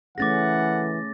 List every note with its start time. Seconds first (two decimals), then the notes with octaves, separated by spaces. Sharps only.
0.18 E3 A3 C#4 G#4 F#5 D6 A6 A#6